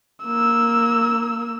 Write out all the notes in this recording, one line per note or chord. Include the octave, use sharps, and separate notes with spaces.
A#3 E6